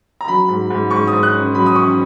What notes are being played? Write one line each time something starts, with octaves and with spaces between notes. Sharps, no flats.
A#5
F#3 B5
G#2
G#2
G#2 C#6
D#6
G#2
F#6
C#4
F#3 B5
D#6
C#4 C#6